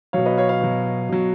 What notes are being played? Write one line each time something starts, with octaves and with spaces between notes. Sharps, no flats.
B2 F#3 C#5 F5
B4 D#5
C#5 F5
C#5 F5
B2 F#3
B2 F#3